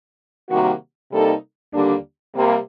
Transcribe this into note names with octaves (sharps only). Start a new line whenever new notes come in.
C3 D#3 G3 A#3 F#4
C3 G3 A#3 D#4 A4
D#2 D3 G3 A#3 D4
C3 G3 A#3